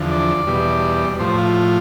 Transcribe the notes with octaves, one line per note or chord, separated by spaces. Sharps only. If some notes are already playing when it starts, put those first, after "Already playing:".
Already playing: E2 D3 F3
D5
E2 B2 G3
A2 F3 C5
F4